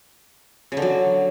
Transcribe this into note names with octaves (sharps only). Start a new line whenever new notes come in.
C#3
D3
F#3